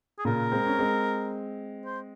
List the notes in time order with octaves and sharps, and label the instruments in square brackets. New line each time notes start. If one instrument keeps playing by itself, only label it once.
[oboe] G#4
[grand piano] A#2 C#3 [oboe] A#4
[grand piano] G#3 C4
C#4
G#3 C4
[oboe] C5